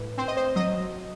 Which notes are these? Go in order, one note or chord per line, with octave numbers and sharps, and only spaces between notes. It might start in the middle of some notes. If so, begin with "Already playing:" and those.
Already playing: A2 B4
C4 C5
D#5
C5
F#3 D#5